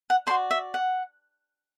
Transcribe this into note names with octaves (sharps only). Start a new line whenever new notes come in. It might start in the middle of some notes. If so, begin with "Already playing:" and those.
F#5
F#4 A4 C5 D5 C6
E5
F#5